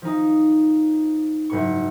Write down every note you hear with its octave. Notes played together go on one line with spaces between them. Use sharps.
F3 D#4
F#1 G#2 C#6